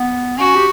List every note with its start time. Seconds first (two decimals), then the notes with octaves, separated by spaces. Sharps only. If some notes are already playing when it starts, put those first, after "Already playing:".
Already playing: B3
0.38 C#4 F#4
0.56 G4